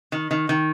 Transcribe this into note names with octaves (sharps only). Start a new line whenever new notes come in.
D#3
D#3
D#3